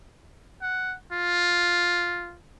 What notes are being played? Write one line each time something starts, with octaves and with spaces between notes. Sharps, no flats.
F#5
F4